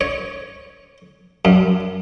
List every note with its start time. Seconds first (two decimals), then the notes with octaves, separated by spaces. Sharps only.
0.01 C#5
1.45 F#2